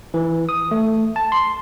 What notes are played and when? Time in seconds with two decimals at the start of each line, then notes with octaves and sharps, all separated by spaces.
0.14 E3
0.49 D#6
0.71 A3
1.16 A5
1.32 C6